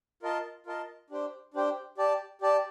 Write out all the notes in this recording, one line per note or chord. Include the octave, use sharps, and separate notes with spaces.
F4 A#4 D#5 A5
F4 A#4 D#5 A5
D4 G4 C5 G5
D4 G4 C5 G5
G4 D5 A5
G4 D5 A5